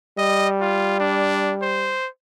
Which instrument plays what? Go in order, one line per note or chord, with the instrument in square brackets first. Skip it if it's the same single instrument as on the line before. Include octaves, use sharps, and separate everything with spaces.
[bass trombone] G3 [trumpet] D#5
[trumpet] F4
D4
C5